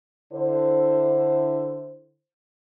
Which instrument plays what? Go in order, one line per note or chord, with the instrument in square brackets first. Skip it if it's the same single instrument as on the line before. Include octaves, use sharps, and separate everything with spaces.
[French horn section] D3 E4 C5